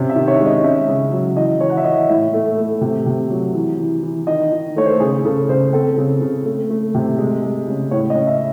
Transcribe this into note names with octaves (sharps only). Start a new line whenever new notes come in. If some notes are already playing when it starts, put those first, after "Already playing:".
Already playing: C3 C#4
E5
D#3
C#5
G#3
D#5
C#4 E5
C#3
F#3
E3 D#5
E3 C#5
F#5
E5
E3 D#5
A2 E5
A3
A3
C3
C3
F#3
E3
E3
E3
D#3 D#5
D#3
A3 C#5
C5
A4
C#3 G#4
C#3 A4
C#3 C5
C4 A4
C#3
C#3
A3
A3
C3
G#3
G#3
C#3
A2 C#5
D#5
C#4
E5